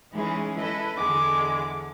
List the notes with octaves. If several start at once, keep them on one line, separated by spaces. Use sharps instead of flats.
E3 G#3 C#4 D#4 G#4
E4 A4 B4 D#5
E2 D3 G#3 D6